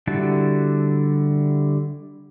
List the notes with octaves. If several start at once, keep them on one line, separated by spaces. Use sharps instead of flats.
D3 G3 E4 F#4 A5